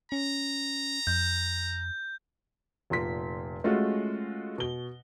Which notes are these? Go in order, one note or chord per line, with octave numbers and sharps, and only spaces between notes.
C#4 A#5
F2 G6
F1 A#2 C6 B6
G#3 A3 C#4 F4 F#4
B2 G7